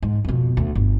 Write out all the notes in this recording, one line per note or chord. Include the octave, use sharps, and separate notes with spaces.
G#2
F2 B2
D2
G1